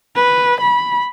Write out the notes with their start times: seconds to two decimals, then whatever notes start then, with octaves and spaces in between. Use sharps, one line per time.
0.15 B4
0.60 B5